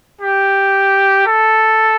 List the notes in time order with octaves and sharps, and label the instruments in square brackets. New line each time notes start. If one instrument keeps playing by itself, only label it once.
[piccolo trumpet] G4
A4